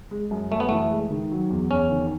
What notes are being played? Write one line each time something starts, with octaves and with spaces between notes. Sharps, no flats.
G#3
F#2
F#2 A3
B3
E3 A3
G#3
D#3
F#3
E2
E2 C#4
D#3